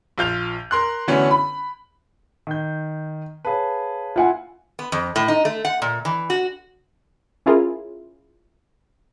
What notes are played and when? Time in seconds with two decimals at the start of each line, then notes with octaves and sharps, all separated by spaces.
0.18 A#1 F4 G6 F7
0.71 A#4 C6 F#6
1.08 D3 E3 A3 B3 C#4 F#4
1.31 B5
2.47 D#3 G6
3.45 G#4 B4 C#5 F5 A5
4.16 E4 F4 F#5 G#5
4.79 B3
4.92 F2
5.16 A2
5.28 D#4
5.45 A3
5.65 F#5
5.82 A#2
6.05 E3
6.30 F#4
7.46 C#4 E4 F4 G#4 A#4